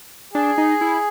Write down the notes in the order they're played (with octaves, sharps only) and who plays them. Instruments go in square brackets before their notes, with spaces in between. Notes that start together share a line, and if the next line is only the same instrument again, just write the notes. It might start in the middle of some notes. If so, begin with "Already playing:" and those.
[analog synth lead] D4 [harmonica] G#4
[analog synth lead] D#4
E4